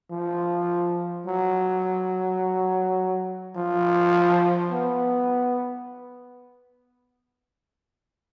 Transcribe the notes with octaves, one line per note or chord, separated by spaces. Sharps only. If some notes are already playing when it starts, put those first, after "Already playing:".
F3
F#3
F3
B3